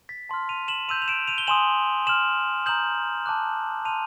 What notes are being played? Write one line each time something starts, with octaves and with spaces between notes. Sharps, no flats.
A6 B6
A5 C6 F6
D#7 F7
E7 F#7
C6 E6 G6 D#7 F7
F7
D7 E7
D#7 F7
G7
G#5 C6 D#6 E7 F#7
C6 F6 E7 F#7
A#5 D#6 G6 E7 F#7
A5 D6 F#6
A5 C6 F6 D#7 F7